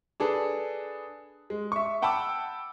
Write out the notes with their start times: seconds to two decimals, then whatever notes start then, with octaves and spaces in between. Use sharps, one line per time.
0.20 D4 G#4 A4 B4
1.50 G#3
1.72 E5 C#6
2.02 F#5 G5 A5 B5 D6 E6